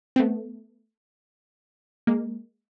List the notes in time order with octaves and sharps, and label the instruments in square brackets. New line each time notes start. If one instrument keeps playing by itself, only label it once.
[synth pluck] C4
A3 B3
G#3 A#3